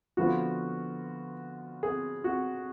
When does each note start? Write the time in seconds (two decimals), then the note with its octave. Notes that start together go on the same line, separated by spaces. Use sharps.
0.17 D3 F3 B3 F4 F#4
1.83 G#4
2.24 F#4